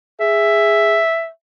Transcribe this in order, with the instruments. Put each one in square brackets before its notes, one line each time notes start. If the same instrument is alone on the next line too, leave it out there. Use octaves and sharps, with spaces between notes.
[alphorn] G#4 [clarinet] E5